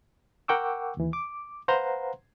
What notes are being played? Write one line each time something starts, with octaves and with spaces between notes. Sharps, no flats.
A#4 F#5 G5 C#6 D6 E6
D#2 E3
D6
B4 C5 F5 F#5 A#5 C6